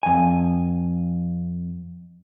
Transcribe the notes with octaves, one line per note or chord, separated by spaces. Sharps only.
F2 G#5